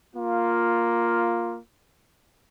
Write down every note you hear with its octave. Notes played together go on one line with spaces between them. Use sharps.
A#3 F4